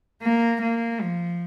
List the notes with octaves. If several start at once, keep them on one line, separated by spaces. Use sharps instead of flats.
A#3
A#3
F3